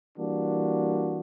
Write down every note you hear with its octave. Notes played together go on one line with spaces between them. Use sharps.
E3 G3 A#3 D4 F#4